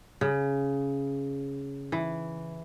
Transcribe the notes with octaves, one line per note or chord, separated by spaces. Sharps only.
C#3
E3